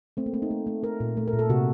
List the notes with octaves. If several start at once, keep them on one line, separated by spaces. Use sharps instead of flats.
A3 C4
A#3
A3 C4
D#4
A3
A3
A3 A#4
A#2
A3
A#4
A#2
A4
C3 F#4